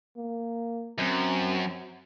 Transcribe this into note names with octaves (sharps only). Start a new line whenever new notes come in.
A#3
F#2 C4